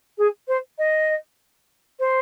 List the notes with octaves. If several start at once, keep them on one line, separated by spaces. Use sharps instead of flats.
G#4
C5
D#5
C5